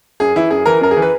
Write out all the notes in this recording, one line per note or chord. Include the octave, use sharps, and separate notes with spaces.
F#2 G#4
E3 E4
F#2 G#4
E3 A#4
F#2 A#4
G#4
E3
B4